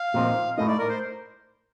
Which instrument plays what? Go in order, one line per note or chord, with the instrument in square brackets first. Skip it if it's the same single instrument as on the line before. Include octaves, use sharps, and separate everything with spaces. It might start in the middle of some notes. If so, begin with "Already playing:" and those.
Already playing: [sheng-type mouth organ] F5
[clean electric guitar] A#2 F3 C4 D#4
[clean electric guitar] A2 A3 D#4 [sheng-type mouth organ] D#5
[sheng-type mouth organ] D5
A#4
C5